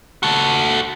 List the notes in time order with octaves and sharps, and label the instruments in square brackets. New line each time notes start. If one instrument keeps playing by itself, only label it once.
[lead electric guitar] F#4 A4